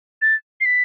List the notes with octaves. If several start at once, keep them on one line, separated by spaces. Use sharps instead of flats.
A6
C7
B6